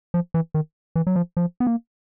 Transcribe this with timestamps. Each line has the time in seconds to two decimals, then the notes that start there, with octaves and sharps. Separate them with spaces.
0.14 F3
0.34 E3
0.54 D#3
0.96 E3
1.07 F#3
1.16 F3
1.37 F3
1.60 B3
1.67 A#3